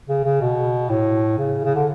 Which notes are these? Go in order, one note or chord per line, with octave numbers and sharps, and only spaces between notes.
C#3
C#3
B2
A2
C#3
C#3
D3